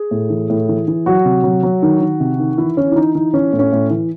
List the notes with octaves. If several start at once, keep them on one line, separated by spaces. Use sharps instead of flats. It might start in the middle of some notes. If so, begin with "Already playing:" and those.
Already playing: G#4
A2
E3
A2
E3
E3
F#3 F#4
C3
F#3
F#3
D#3
D#3
C3
D#3
E3 E4
E3 C#4
E4
E3 D#4
E3 D#4
E3 C#4
A2
C#4
A2
E3